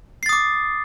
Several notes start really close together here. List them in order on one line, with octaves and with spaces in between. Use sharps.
C7 A6 D#6 D6